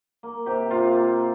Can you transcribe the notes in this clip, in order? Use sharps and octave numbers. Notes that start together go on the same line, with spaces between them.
A#3
C3 G4
C3 F4
A#3
A#3